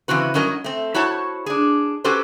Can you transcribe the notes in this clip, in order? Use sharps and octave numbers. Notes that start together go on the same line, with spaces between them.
C#3 E3 C4 F#4 B4
G2 F#3 C#4 A#4 D#5
A3 C4
E4 F#4 C5 C#5 A5
D4 G#4
C#4 F#4 G4 A4 B4 C5